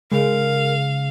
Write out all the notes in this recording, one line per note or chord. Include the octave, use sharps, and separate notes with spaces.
C#3 G#3 A#4 F5